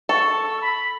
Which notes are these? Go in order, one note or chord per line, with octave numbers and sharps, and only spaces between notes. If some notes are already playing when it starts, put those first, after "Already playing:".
A4 C#6
E6
B5